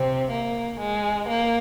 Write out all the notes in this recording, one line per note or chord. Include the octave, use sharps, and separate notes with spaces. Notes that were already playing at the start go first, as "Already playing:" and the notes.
Already playing: C3 C4
A#3
G#3
A#3